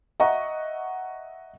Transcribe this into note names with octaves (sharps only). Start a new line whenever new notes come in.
D#5 E5 F#5 A#5 C#6